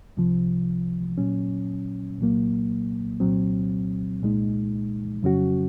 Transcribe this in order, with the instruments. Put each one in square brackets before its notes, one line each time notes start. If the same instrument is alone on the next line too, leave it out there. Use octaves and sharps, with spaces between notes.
[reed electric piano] C2 C3 F3
A#2 F#3 C#4
C2 A#2 F#3 A#3
C2 A#2 F#3 C4
C2 A#2 G#3 D#4
F2 C#3 F#3 C#4 F#4